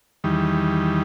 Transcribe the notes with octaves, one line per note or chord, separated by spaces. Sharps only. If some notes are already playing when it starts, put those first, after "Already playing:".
E2 D#3 G3